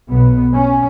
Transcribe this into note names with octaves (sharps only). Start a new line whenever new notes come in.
B1 B2 B3
C#4